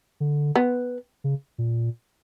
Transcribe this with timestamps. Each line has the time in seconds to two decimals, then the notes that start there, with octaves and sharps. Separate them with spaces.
0.20 D3
0.55 B3
1.24 C#3
1.58 A#2